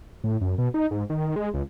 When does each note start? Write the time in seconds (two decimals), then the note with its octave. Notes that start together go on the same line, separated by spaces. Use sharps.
0.24 A2
0.41 F#2
0.58 B2
0.74 D#4
0.91 G#2
1.10 D#3
1.36 G#3
1.54 C#2